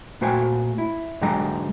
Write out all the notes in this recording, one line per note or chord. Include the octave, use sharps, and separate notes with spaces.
A#2 A3 F#4 C5 G5 G#5
E4
G#2 D3 F#3 G#3 G5 A#5